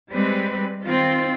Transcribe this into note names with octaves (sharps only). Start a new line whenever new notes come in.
G3 G#3 C4 B4
D#3 C4 F4